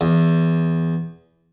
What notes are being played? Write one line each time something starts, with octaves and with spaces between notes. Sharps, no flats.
E2